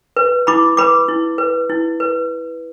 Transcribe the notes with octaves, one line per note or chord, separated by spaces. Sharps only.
B4
E4 B5 D6
B4 B5 D6
E4
B4
E4
B4